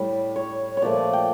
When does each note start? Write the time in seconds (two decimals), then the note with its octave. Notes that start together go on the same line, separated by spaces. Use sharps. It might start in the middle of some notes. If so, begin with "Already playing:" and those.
Already playing: A2 G3
0.36 C#5
0.77 C#5
0.82 A#2 F3 A3 D5
1.13 G5